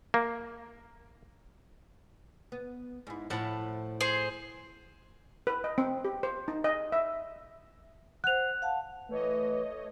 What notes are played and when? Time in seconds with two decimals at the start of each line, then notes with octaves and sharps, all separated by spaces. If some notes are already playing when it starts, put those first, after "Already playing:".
0.14 A#3
2.52 B3
3.07 G#2 E4
3.30 A2 F3 E4 F#5 A5
4.01 G#4 C5
5.47 B4
5.64 D#5
5.78 C4
6.05 G4
6.23 C5
6.48 D#4
6.64 D#5
6.92 E5
8.24 C5 F#5 F#6 F7
8.62 F5 F#5 A5
9.09 E3 A3 C#5 D#5